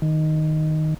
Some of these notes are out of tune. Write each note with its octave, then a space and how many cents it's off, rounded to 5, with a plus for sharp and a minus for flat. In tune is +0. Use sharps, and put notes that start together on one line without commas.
D#3 +0